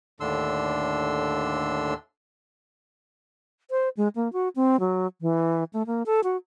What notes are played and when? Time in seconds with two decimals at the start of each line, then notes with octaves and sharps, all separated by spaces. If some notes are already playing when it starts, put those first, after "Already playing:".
0.20 D#2 A2 D3 D4 C6 E6
3.71 C5
3.97 G#3
4.16 A#3
4.33 F#4
4.56 C4
4.80 F#3
5.22 E3
5.73 A3
5.87 A#3
6.06 A4
6.24 F#4